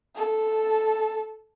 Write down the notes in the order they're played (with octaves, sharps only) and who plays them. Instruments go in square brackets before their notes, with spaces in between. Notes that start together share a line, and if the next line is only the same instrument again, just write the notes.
[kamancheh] A4